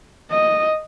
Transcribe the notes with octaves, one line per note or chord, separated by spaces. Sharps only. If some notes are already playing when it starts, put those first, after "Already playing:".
D#5